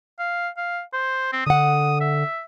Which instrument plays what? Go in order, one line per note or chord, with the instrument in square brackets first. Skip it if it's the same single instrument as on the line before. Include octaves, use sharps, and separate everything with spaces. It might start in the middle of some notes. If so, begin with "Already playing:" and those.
[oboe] F5
F5
C5
C4
[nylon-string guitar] D3 F#5 [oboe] D#6
[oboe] E5